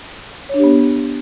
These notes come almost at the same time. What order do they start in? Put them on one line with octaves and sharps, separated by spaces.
C#5 D4 G4 B3